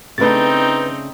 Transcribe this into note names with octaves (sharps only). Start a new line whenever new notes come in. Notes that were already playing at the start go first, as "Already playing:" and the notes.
C#3 A3 C4 D4 D#4 B4 A6